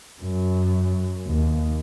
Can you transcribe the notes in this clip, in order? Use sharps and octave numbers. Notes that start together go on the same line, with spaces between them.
F#2
D#2